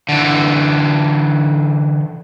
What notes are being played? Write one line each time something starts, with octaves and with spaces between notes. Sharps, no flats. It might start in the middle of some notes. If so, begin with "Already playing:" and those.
D3 E3